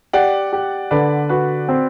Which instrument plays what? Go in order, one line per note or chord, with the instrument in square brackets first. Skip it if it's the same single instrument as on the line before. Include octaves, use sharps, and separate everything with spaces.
[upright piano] G4 [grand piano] D5 F#5
[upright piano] G4
[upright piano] D3 [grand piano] B4 D5
[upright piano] F#4 [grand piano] B4
[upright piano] C4